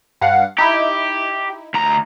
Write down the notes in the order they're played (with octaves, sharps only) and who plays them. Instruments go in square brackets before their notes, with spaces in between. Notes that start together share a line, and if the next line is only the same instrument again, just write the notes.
[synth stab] G2 F5 F#5
[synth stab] D#4 E4 [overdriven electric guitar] G4
[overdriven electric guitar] D2 A#5